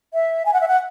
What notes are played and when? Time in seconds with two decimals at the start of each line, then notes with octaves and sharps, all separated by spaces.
0.14 E5
0.46 G#5
0.53 F#5
0.61 E5
0.68 F#5